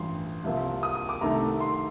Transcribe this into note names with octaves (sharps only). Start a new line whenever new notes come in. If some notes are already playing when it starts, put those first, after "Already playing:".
Already playing: A1 G2 F3 C6
C2 C3 F3 A#3
D#6
D#6
D6
C2 C3 D#3 A3 A#5
C6